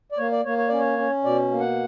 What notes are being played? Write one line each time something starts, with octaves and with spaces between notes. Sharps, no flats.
D5
A#3 C#5
D5
A#3 C#5
C#5
C#4 D5
C#5
C#4
B2 D5
A#3
F#5